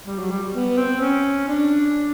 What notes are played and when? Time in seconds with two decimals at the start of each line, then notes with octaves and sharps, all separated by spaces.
0.06 G3
0.19 F#3
0.31 G3
0.54 B3
0.77 C4
1.00 C#4
1.48 D4